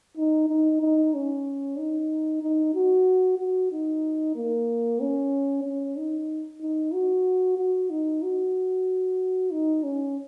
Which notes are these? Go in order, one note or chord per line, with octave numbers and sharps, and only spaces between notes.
D#4
D#4
D#4
C#4
D#4
D#4
F#4
F#4
D#4
A#3
C#4
C#4
D#4
D#4
F#4
F#4
D#4
F#4
D#4
C#4